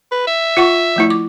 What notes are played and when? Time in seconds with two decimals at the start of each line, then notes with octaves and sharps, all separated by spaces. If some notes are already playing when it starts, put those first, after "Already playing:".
0.12 B4
0.27 E5
0.57 F4 F#5 C#6
0.96 F3 A3 E4
1.10 D6